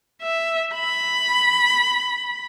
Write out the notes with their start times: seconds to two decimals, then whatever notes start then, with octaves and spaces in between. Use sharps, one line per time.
0.22 E5
0.75 B5